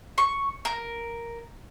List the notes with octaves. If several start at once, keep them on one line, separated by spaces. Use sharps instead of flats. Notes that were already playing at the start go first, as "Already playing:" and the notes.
C#6
A#4